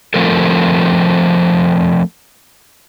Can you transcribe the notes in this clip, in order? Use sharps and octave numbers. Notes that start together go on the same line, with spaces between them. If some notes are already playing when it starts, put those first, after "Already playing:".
F3 A3 C4 A4 A#4